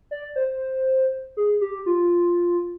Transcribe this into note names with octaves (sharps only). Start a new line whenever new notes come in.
D5
C5
G#4
G4
F4